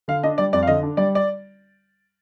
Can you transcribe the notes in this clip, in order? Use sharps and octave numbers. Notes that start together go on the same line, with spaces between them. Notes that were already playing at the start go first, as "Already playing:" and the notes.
D3 F5
D4 D#5
G3 D5
F2 D5
F5
D3 D#5
D4
G3 D5
D5